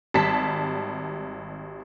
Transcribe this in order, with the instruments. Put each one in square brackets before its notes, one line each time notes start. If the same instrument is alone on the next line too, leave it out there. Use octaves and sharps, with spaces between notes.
[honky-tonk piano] G#1 G3 A5 B6